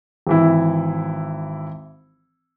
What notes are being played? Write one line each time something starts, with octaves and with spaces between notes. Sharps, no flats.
G#1 E3 E4